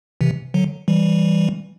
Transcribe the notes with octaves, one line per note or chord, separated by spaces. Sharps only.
C3 E3
D3 F#3
E3 G3